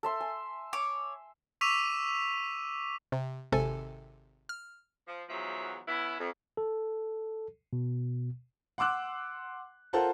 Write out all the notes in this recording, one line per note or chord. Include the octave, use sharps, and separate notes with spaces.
A4 E5 C6
G#5
C#5 D6
C#6 D6 E6 B6 D#7 F7
C3
G#1 C3 A4 G#5
F6
F3
E2 G#2 F3 F#3 E5
B3 C#4 E4
F2
A4
B2
F#5 C6 D6 E6 F#6
F4 A4 A#4 C5 F#5 A5